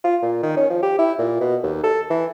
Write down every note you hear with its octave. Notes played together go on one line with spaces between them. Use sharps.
F4
A#2
D#3
C#4
F3
G4
E4
A#2
B2
D#2
A4
E3